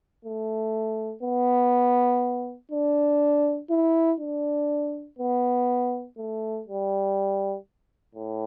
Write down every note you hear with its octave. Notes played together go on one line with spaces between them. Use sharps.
A3
B3
D4
E4
D4
B3
A3
G3
A2